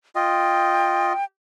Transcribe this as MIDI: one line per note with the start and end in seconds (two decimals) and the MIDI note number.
0.15 1.13 65
0.15 1.13 75
0.15 1.24 79